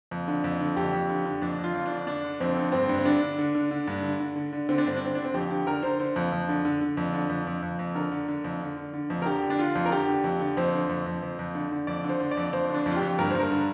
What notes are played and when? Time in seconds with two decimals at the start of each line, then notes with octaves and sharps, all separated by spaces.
0.11 F2
0.28 D3
0.44 F2
0.61 D3
0.76 F2 G4
0.93 F2
1.09 D3
1.25 D3
1.42 F2 D4
1.59 F2
1.64 F4
1.74 F2
1.86 D4
1.91 D3
2.07 D3 D4
2.24 D3
2.40 F2 C4
2.57 D3
2.72 G2 C4
2.89 G2
2.99 C4
3.05 D3 D4
3.22 D3
3.38 D3
3.55 D3
3.71 D3
3.87 G2
4.03 D3
4.20 D3
4.36 D3
4.52 D3
4.69 D3 C4
4.78 D4
4.85 G2 C4
4.96 D4
5.02 D3 C4
5.15 D3 D4
5.24 C4
5.34 F2 G4
5.50 D3 G4
5.66 D3 A#4
5.83 D3 C5
6.00 D3 C5
6.16 F2
6.32 F2
6.49 D3
6.65 D3
6.81 D3
6.97 F2
7.13 D3
7.30 F2
7.47 F2
7.62 F2
7.79 F2
7.95 D3 A#4
8.12 D3
8.28 D3
8.44 F2
8.61 D3
8.77 D3
8.93 D3
9.10 F2
9.22 A#4
9.26 D3 G4
9.42 D3
9.50 D4
9.59 D3 F4
9.75 F2
9.86 A#4
9.92 D3 G4
10.08 D3
10.24 F2
10.41 D3
10.57 F2 C5
10.73 D3
10.89 F2
11.06 F2
11.22 F2
11.39 F2
11.55 D3
11.71 D3
11.87 F2 D5
12.04 D3
12.09 C5
12.20 D3
12.31 D5
12.37 F2
12.53 F2 C5
12.70 D3 D4
12.86 F2
12.91 F4
12.96 G4
13.02 F2
13.19 G2 A#4
13.31 G2 C5
13.40 A#4
13.51 D3